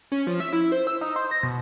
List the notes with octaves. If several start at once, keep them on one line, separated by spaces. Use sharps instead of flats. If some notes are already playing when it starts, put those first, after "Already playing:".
C#4
F3
E5
E4
C5
E6
D#4
C5
A#6
B2